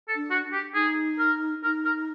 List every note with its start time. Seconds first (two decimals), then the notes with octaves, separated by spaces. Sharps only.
0.08 A4
0.15 D4
0.31 F#4
0.53 G4
0.75 D#4 G#4
1.19 A#4
1.63 D#4 A#4
1.85 A#4